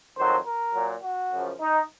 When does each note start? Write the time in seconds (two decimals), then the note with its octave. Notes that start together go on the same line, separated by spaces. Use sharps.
0.17 F2 D#3 F#3 C5
0.46 A#4
0.74 A#2 F#3
1.03 F#4
1.32 F#2 C#3 F3
1.60 D#4